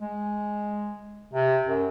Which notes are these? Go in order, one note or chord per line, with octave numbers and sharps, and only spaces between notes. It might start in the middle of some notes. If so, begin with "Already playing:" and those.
G#3
C3
F#2